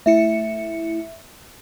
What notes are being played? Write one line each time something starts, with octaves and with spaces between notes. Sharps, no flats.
A3 E4 E5 C#7